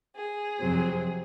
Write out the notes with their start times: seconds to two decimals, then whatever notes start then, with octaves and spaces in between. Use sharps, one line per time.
0.15 G#4
0.59 F2 C3 F#3 C4